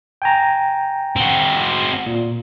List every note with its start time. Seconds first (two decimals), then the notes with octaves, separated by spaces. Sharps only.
0.22 G5 G#5 A#5
1.16 C4 F#4
2.06 A#2